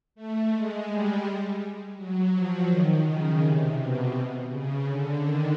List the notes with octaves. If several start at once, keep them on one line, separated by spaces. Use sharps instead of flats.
A3
G#3
G3
F#3
F3
D#3
C#3
C3
B2
C#3
D3
D#3